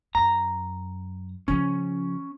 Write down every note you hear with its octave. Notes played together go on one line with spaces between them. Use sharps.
F#2 A#5
C#3 F3 C#4